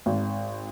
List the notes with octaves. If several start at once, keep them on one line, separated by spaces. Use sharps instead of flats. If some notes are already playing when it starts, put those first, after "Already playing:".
G#1